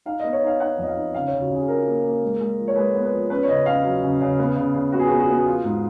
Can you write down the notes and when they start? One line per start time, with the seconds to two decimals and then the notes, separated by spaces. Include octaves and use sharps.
0.06 D#4 F5
0.20 B3 D#5
0.33 C#5
0.42 D#4 F5
0.60 D#4 F#5
0.78 F2 D#5
0.88 F5
0.96 D#4
1.14 C#3 F5
1.27 C#5
1.33 C#3
1.41 F#4
1.50 C#3 G#4
1.68 F3 A#4
1.86 A#3
2.04 A#3
2.22 G#3
2.40 G#3
2.58 F3
2.68 C#5
2.76 G#3 B4
2.95 B3
3.03 B4
3.12 F3
3.30 C#4 B4
3.43 C#5
3.48 C#3 D#5
3.66 C#4 F5
3.85 F#3
4.03 C#3
4.21 C#3
4.39 B3
4.56 C#3
4.75 C#3
4.92 B3 F#4
5.00 G#4
5.07 F#4
5.11 B3
5.20 F#4
5.29 B3
5.37 F#4
5.46 F3 F4
5.64 G#2